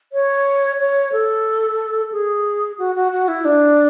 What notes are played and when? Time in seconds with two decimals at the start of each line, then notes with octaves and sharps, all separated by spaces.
0.13 C#5
0.79 C#5
1.12 A4
2.12 G#4
2.79 F#4
2.95 F#4
3.12 F#4
3.28 E4
3.45 D4